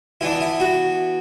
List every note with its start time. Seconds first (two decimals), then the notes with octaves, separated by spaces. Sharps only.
0.21 E3 B3 D4 E4
0.41 E4
0.60 F#4